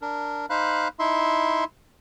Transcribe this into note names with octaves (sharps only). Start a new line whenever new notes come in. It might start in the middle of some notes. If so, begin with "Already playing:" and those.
D4 A#4
D#4 C5 F5 B5 F#6
D#4 E4 E5 C6